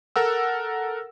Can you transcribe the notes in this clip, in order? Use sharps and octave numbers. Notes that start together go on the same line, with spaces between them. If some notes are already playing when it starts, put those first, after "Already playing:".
A4 A#4 F#5 E6